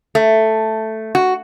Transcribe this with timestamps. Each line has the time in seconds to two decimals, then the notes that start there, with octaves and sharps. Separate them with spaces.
0.15 A3
1.15 F#4